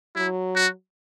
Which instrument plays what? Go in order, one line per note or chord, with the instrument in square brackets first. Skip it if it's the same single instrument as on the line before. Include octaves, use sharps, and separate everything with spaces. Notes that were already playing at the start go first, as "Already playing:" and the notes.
[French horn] F#3 [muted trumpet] E4
[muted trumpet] F#4